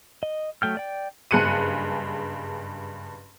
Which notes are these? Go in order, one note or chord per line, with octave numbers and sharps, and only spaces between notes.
D#5
F#3 A3 G5 F6
D5 G5
F#1 G2 G#4 F#6 C#7 D#7